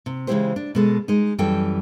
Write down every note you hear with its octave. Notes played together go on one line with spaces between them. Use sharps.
C3
C#3 E3 G#3 E4 G4 C5
D4
B2 G#3 A4
G#3 D#4
F#2 E3 G3 A4 G5